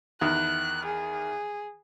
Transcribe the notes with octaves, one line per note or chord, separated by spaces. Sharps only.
E2 D#3 F#6
G#4